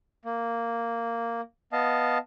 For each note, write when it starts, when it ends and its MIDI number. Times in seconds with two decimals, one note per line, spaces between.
0.25 1.41 58
1.73 2.18 59
1.73 2.18 75
1.73 2.18 77
1.73 2.18 81